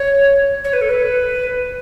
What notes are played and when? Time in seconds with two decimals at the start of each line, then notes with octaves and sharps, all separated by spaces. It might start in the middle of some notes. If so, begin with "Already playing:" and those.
Already playing: C#5
0.64 C#5
0.73 B4
0.81 A4
0.89 B4